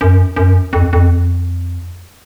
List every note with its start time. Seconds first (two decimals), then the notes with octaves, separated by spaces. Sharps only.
0.01 F#2
0.36 F#2
0.73 F2
0.93 F2